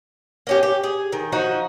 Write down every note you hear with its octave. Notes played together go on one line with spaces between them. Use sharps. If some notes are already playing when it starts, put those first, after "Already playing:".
A#3 C#4 G4
G4
G#4
D#3
F3 D#4 F#4